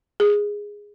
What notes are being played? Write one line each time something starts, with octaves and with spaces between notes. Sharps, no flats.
G#4